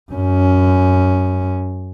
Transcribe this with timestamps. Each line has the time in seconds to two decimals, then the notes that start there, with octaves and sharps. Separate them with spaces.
0.12 F#2 C#4